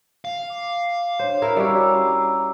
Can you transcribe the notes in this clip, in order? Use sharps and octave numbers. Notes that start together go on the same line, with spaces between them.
F5
D6
D4 C5 C#5
E4 A#4 E5
G3 C#4 F#4 A#5 D6 E6